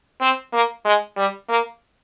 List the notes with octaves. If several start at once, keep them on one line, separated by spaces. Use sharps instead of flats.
C4
A#3
G#3
G3
A#3